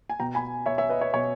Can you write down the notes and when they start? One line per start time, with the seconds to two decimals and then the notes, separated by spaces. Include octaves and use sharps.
0.10 G#5
0.20 B2 G5 A#5
0.35 G#5 B5
0.66 B2 C#5 E5
0.78 C#5 E5
0.89 B4 D#5
1.01 C#5
1.14 B2 C#5